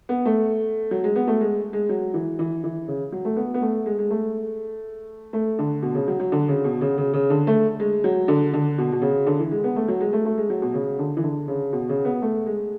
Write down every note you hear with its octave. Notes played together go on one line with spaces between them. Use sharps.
B3
A3
F#3
G#3
B3
A3
G#3
G#3
F#3
E3
E3
E3
C#3
F#3
A3
B3
B3
A3
G#3
G#3
A3
A3
D3
B2
C#3
F#3
F#3
D3
C#3
B2
C#3
C#3
C#3
D3
A3
G#3
F#3
D3
D3
B2
B2
C#3
D3
E3
G#3
B3
A3
F#3
G#3
A3
A3
G#3
F#3
B2
C#3
D3
E3
D3
C#3
B2
C#3
B3
A3
G#3